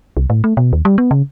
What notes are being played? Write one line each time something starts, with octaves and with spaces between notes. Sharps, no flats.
C2
A2
A3
B2
D#2
G3
B3
C#3